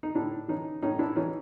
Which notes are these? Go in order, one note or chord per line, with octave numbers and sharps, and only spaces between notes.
D#4
A2 D4 E4
E3 C#4 D#4
A2 C#4 D#4
D4 E4
E3 C#4 D#4